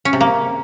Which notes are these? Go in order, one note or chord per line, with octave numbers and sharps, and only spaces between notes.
C#4
C3
A#3